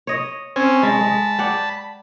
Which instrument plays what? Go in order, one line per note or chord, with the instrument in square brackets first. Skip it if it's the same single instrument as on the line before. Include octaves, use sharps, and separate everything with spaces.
[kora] C#5 D#5
[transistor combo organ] C4 C#4 G#5
[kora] G#3 [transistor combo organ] A5 B5
[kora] G#3
D5 F#5 G5